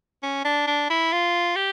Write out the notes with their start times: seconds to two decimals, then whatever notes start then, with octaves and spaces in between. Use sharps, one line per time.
0.23 C#4
0.44 D4
0.67 D4
0.90 E4
1.12 F4
1.56 G4